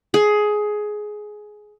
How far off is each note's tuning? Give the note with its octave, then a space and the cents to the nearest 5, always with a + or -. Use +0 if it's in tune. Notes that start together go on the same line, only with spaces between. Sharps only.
G#4 +15